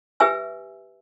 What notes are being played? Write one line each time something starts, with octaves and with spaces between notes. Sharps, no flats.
G4 B4 E5 G#5 E6